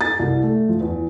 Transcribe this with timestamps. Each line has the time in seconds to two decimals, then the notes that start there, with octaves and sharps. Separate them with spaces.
0.01 A6
0.19 C2
0.43 A3
0.69 F3
0.81 E2